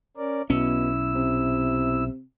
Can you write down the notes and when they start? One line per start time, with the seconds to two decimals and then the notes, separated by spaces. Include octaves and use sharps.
0.17 C#4 A#4 D5
0.50 B1 B2 C#4 E4 E6
1.15 C3